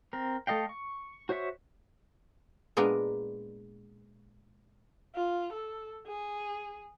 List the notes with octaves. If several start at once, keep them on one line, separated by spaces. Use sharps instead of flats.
C4 A#4
A3 A4 D#5 F5 G5
C#6
F#4 C5 C#5 E5 C#6
A#2 G#3 B3 D4 A#4
F4
A4
G#4